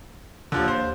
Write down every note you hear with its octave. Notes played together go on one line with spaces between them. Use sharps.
D#2 D3 F3 D4
C5